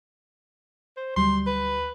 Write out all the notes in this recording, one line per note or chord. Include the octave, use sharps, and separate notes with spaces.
C5
D2 F#3 G3 C6
B4